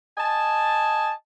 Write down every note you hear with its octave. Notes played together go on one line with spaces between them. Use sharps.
D#5 G#5 A5